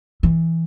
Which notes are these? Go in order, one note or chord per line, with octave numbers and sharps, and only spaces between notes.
E3